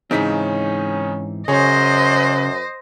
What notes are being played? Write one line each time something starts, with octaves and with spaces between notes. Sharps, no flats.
G#2 C#3 E3 C4 C#4 D#4 B6
F#2 C#3 G#4 C5 C#5 D#5